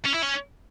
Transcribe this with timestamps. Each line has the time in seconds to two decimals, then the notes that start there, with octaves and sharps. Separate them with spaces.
0.05 C#4
0.14 E4
0.22 C#4